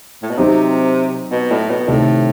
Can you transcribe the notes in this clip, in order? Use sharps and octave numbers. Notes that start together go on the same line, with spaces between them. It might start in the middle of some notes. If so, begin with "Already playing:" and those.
A2
B2
C3 F#3 C4 D#4 G4
B2
A2
B2
A2 C3 D#3 A3